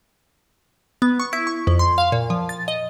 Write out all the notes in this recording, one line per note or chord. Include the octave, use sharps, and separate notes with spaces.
B3
C#6
E4
C#6
F2
C6
F5
A#2
F3
A6
D#5